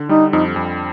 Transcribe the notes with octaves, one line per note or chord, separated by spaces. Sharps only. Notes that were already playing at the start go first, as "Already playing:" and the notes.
Already playing: D3
G3 D#4
F2 D#4
F2